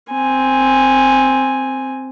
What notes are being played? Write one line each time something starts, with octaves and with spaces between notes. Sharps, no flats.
C4 G#5